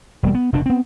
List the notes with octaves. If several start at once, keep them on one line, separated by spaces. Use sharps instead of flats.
E1 G3 A#3
B3
F1 B2 D4
B3 C4